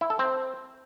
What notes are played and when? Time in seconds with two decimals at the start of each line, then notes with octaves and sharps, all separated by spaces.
0.01 E4
0.10 A4
0.19 C4